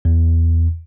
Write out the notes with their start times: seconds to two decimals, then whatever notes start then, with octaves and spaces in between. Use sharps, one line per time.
0.05 E2